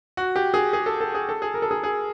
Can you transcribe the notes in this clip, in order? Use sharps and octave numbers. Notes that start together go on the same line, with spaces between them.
F#4
G4
G#4
G#4
A4
A4
G#4
A4
G#4
A#4
A4
G#4
G#4